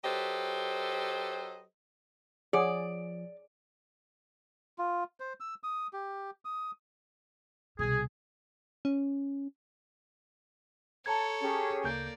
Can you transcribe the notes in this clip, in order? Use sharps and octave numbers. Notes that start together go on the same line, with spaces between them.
F#3 G4 A4 B4 C5 D#5
F3 G#4 C#5 D5 F#5
F4
C5
E6
D#6
G4
D#6
C2 B2 G#4
C#4
A4 C#5 A5 A#5 G#6
C#4 G4 G#4
D2 C#3 A#3 D5 G6